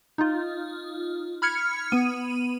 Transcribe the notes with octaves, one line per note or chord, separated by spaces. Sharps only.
D#4 F4
B5 F6 G#6 C#7
B3 D#7